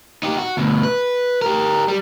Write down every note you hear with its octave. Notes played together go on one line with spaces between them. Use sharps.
D#4 G4
F#4
D2 B2
B4
G4 A#4
G3